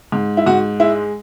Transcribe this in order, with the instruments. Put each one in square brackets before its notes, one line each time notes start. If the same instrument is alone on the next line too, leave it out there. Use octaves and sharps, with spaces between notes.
[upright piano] G#2
E4
G#2 F#4
G#3 E4